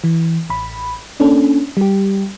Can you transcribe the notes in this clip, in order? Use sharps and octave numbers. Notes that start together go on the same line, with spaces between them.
E3
A1 B5
A#3 C#4 D4 A4
G3 G4